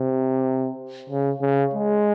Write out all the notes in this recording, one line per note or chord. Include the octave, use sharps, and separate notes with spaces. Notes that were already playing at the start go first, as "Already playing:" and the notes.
Already playing: C3
C#3
C#3
G#3